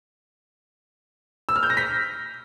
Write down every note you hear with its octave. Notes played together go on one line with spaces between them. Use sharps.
E6
F6
G6
A#6
B6